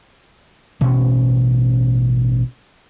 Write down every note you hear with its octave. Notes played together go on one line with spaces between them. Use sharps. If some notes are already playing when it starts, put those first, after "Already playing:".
A1 B2 C#4